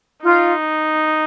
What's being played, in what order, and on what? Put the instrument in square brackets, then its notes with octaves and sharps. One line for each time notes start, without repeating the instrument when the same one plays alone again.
[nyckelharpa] D#4 [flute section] F4